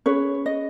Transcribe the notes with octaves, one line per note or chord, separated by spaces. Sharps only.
C#4 G#4 B4 C#5
D#5